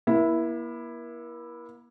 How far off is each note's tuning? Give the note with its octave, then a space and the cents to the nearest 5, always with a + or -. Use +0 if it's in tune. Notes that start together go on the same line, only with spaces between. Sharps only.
A#3 +40 E4 +0